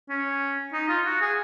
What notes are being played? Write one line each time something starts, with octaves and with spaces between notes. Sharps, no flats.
C#4
D#4
F4
F#4
G#4